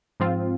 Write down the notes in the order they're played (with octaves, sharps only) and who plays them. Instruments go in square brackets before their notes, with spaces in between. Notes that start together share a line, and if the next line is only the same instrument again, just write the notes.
[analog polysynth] G#2 F3 C4 F4